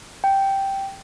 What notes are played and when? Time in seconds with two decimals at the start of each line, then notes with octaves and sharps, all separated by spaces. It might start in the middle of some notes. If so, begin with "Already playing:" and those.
0.24 G5